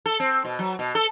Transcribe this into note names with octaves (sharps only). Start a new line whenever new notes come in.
A4
C4
B2
F#3
B2
A4